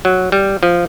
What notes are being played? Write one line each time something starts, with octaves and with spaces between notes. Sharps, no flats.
F#3
G3
F3